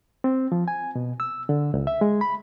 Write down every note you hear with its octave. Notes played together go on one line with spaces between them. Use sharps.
C4
F3
G#5
B2
E6
D3
C#2
E5
G#3
B5